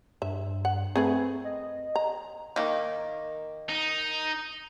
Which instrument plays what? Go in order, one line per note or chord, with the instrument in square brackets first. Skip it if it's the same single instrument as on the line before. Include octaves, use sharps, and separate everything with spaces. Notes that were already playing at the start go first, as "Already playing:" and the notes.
[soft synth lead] G2 [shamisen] E5
[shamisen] F#5
[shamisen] A3 G#4 B4 [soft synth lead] C4
[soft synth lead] D#5
[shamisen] A#5
[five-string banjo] D#3 A#3
[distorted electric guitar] D#4